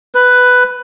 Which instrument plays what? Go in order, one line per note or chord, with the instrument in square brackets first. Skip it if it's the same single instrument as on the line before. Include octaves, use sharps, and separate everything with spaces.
[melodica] B4